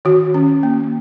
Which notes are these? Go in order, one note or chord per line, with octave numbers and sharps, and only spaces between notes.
D#3 F#4
C#4
A#3